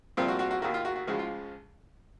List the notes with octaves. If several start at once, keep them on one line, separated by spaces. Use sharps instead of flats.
C2 A#2 F3 C4 F4
F#4
F#4
F#4
D#2 D#3 A#3 F#4
F4
F#4
F#4
C#2 C#3 F3 G#3 F#4
F4